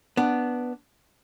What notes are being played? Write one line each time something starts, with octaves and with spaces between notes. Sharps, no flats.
B3 D4